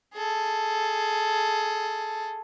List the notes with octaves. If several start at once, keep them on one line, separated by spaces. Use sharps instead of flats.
G#4 A4